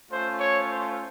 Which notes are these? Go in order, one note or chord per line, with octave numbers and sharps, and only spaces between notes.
A3 C#4 F4 C5
C#5
C5